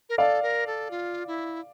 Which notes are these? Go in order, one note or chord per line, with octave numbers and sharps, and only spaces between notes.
A#4
A4 D5 F5
A#4
A4
F4
E4